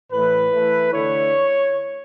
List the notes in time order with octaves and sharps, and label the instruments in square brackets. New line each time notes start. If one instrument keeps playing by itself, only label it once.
[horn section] A2 E3 A3 E4 B4
E3 A3 E4
D3 A3 E4 C#5